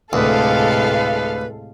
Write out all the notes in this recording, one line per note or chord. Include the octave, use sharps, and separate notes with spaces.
D2 A2 C3 G#3 A4 B4 F5